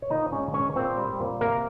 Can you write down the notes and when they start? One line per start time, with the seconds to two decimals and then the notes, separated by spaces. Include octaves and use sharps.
0.02 C#5
0.10 A#2 D#4 D#5
0.32 G#3 C#4 C#5
0.54 G#3 C#4 C#5
0.76 A#2 C4 C5
0.98 G3
1.20 A#2
1.41 C3 A#3 A#4